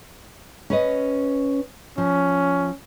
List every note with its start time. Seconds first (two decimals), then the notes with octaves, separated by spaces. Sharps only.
0.70 C#4 B4 D#5
1.98 F3 C#4